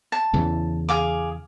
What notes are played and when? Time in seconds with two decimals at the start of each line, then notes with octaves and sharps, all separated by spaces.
0.12 A5
0.33 E2 C#3 E3
0.89 G#4 F5 D6